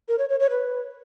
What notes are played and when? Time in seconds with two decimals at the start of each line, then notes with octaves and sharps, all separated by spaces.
0.08 A#4
0.18 C#5
0.29 C#5
0.40 C#5
0.50 B4